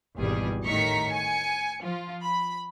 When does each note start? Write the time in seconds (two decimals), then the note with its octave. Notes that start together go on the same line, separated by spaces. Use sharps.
0.17 G#1 E2 B2 G3 G#4
0.65 A2 D#3 A#5 C#6 B6
1.11 G#5 C#7
1.82 F3 F4
2.22 B5